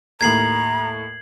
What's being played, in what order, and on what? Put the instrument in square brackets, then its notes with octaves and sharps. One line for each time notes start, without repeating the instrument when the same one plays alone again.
[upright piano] D#2 A2 [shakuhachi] A#5 [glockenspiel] G#6 C7 F#7